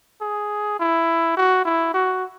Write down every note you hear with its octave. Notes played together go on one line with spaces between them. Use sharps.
G#4
E4
F#4
E4
F#4